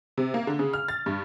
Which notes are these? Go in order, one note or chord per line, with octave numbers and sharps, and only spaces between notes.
C3
A#3
D3
C#3
F6
A6
G2